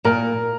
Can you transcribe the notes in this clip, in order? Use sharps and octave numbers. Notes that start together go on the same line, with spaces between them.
A#2 A#4